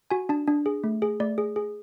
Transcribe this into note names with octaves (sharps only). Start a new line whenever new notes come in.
F#4 G#5
D4 A5
D4
G#4
A3
G#4
A3 D5
G#4
G#4